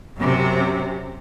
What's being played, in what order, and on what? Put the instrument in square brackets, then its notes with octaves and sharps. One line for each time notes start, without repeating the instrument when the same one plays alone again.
[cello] F#2 C3